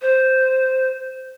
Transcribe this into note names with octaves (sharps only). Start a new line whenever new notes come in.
C5